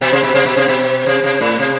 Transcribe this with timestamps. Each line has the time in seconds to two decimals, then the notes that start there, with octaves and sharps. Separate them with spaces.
0.01 B2
0.12 C3
0.23 B2
0.35 C3
0.45 B2
0.57 C3
0.68 B2
1.06 C3
1.24 C3
1.41 A2
1.59 C3